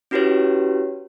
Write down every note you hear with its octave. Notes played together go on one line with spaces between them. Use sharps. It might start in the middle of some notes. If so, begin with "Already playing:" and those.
C#4 E4 F#4 G4 B4 C#5